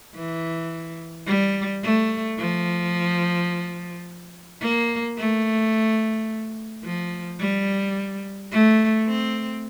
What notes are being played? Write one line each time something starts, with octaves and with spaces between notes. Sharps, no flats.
E3
G3
A3
F3
A#3
A3
F3
G3
A3
C4